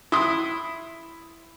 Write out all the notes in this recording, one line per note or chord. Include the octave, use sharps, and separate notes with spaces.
E4 C6 D#6